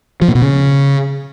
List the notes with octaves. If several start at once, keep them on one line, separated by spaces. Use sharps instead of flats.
F3
A#2
B2
C#3